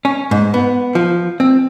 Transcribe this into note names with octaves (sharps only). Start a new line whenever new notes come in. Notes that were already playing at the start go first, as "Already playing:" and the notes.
C#4
G#2
B3
F3
C4